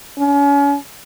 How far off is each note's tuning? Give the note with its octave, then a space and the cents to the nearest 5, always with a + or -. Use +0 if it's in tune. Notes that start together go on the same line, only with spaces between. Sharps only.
C#4 +35